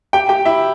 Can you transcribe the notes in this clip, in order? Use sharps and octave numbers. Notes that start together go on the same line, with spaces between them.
G4 G5
G4 G5
E4 E5